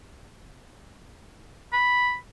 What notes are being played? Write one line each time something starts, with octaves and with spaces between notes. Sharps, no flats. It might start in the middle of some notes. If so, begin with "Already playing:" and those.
B5